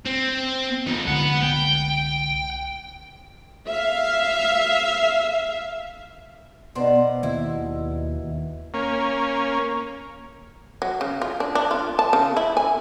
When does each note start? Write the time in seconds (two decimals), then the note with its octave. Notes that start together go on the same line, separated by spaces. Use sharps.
0.05 C4
0.87 F3 D#4
1.07 C2 D3 G#3 B3 F#5
1.43 G5
3.67 E5 F5
6.75 B2 B3 D#4 C5 D5
7.23 D#2 E4
8.74 A#3 C#4
10.82 F#3
11.01 C#3
11.22 F4
11.40 D4
11.55 D4
11.71 F4
11.99 A5
12.13 C#3
12.37 E4
12.57 G#5